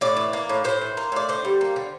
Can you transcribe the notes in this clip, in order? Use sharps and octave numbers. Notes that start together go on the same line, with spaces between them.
A2 D5
E3
A#3
A2
A2 C5
E3
A#3
A2 D5
D3 C5
G3
A#3
D3